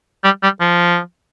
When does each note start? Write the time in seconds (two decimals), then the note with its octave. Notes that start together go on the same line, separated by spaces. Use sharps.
0.24 G3
0.43 G3
0.60 F3